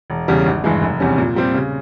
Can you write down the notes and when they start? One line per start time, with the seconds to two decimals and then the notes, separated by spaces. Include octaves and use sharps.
0.10 E1
0.28 E2 C#3 G3
0.46 G#1
0.64 G2 E3 G#3
0.82 F1
1.00 E2 C3 G3 C#4
1.18 A#2
1.36 G3 C4 G4
1.55 C#3